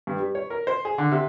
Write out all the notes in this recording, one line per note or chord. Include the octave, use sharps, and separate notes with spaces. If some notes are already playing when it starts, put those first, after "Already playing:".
G2
G3
C#5
A#4
C5
G#4
D3
C3